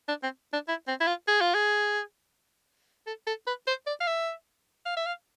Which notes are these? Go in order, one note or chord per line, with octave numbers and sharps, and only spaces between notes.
D4
C4
D4
E4
C4
E4
F4
G#4
F4
G#4
A4
A4
B4
C5
D5
F5
E5
F5
E5
F5